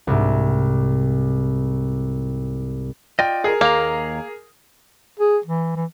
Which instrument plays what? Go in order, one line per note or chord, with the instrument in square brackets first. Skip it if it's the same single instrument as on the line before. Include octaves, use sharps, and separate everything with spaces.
[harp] C2 G#2
[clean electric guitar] F4 D5 D#5 [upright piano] G5
[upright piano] G#4 A#4
[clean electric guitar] D#2 A#5 [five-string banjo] A#3
[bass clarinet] G#4
E3
E3